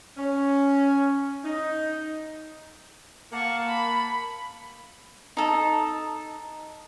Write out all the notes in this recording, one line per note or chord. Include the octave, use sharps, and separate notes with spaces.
C#4
D#4
A#3 F#5 A5 C#6
B5
D#4 A4